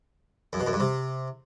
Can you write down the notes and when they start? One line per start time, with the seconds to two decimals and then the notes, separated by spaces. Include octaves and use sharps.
0.53 F#2
0.60 B2
0.66 F#2
0.73 G2
0.80 C3